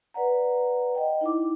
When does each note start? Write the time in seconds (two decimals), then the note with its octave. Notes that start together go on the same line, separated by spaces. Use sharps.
0.14 B4 D5 F#5 A#5
0.95 D#5 G5
1.21 D#4 E4 D6